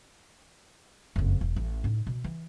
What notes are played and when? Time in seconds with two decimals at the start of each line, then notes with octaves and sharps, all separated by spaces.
1.16 F#1 F2
1.41 E1
1.56 A1
1.84 A2 D#4
2.07 B2
2.24 E3